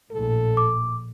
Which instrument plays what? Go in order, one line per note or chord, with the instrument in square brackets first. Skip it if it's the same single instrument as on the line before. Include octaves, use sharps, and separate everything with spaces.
[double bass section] A#1 A2 [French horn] A4
[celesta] D6